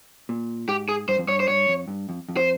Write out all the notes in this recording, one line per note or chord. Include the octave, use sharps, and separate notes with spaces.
A#2
G#2 G4
G#4
G2 C5
F2
G2 C#5
C5
G2 C#5
F2
G2
F2
F2
C5